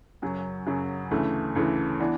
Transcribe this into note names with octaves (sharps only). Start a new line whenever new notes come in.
F#2 C#3 F#3
F#2 C#3 F#3
D2 C#3 E3 A3
D2 C#3 E3 A3
E3 B3 D4